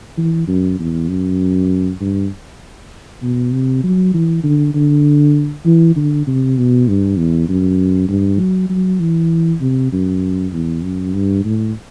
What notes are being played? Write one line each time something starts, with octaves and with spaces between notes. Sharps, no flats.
E3
F#2
E2
F#2
G2
B2
C3
F#3
E3
D3
D3
E3
D3
C3
B2
G2
E2
F#2
G2
F#3
F#3
E3
C3
F#2
E2
F#2
G2
A2